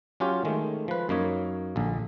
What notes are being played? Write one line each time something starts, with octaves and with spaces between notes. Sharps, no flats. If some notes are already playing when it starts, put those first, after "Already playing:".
F#3 C#4 F4 G4 C#5
D#3 G#3 A3
F3 B4
F#2 A#3 D#4 C#5
A#1 D3